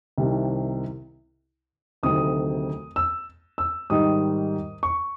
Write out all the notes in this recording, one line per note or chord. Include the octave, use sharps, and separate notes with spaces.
C2 C3 D#3
D2 C3 D#3 F#3 A3 D#6
E6
E6
G#2 D#3 G3 D#6
C#6